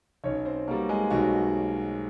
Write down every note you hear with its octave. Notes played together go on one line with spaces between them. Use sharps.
B1 C#4 C#5
C4 C5
B2 G3 A#3 A#4
G#3 G#4
B1 F#4